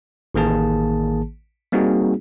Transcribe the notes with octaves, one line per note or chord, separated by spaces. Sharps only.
A1 D#3 A#3 G#4 A5
G3 A#3 C4 D#4 F#4 G#4